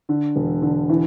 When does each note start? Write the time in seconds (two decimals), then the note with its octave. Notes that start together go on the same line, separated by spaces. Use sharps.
0.09 D3
0.36 E1
0.62 D3
0.89 E3